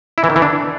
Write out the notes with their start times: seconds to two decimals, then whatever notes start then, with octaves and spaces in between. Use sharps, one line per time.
0.18 E4
0.24 E3
0.30 D#3
0.36 E3
0.42 D4